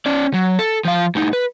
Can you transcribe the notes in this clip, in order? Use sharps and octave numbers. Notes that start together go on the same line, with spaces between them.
C#4 D5
F#3
A4
F3 F5
A2 D#4
B4